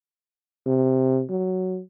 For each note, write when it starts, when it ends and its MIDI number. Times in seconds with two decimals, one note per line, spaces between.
0.66 1.24 48
1.30 1.80 54